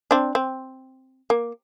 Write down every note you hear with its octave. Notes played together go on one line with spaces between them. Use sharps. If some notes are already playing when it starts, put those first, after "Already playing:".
C4 D4
C4
A#3